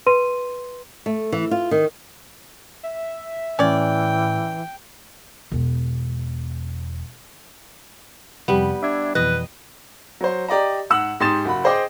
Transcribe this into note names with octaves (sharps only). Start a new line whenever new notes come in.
B4 C6 D#7
A3
E3
F4
D#3
E5
A2 E3 C#4 D5 G5
E1 B3
F2 C3 G3 B3
D4 E5 G#6
F2 B2 E3 B4 D#5
F#3 C5
G4 D5 D#5 A#5
G#2 F#5 E6 F#7
G#2 G4 C6 D#6 A6 E7
F#1 F#4 B5
G#4 C5 D#5 G5 D6